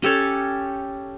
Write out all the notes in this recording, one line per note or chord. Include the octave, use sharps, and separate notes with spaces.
C#4 G4 A4 C#5